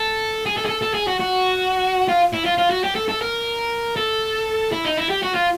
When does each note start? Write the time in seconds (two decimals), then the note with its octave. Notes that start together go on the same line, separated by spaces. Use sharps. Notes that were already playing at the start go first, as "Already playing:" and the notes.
Already playing: A4
0.46 G#4
0.57 A4
0.65 G#4
0.69 A4
0.82 A4
0.95 G#4
1.08 F#4
1.20 F#4
2.09 F4
2.34 E4
2.46 F4
2.58 F4
2.71 F#4
2.84 G4
2.95 A4
3.09 A4
3.21 A#4
3.96 A4
4.72 E4
4.85 D#4
4.97 E4
5.09 G4
5.23 F#4
5.35 F4